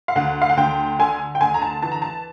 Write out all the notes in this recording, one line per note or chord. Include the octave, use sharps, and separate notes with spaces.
F5
D2 F#5
F5
F#5
D2 G5
D3 G#5
G5
D2 G#5
A#5
A5
E3 A5
A#5
A5